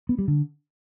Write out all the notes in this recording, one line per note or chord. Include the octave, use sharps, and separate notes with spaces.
B3
G3
D3